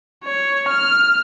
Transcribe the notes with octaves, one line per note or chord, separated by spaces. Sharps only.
C#5
F6